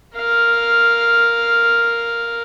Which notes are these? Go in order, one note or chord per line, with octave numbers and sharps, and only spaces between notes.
A#4 F5